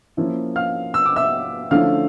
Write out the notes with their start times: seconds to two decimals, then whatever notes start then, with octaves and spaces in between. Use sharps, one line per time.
0.17 F3 A#3 C#4 E4
0.56 F5 F6
0.94 E6
1.05 D6
1.16 E5 E6
1.71 D3 F3 A3 C#4 E4 F5 F6